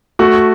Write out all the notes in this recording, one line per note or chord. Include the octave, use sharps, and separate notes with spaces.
A3 F#4